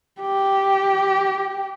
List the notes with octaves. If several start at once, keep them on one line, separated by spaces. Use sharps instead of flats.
G4